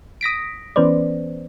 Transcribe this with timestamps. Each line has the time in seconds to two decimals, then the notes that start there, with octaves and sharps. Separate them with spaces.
0.21 D#6 A#6 B6 D7
0.76 E3 B3 C#4 B4 C5 D5